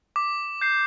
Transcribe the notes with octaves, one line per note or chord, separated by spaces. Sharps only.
D6
G6 C7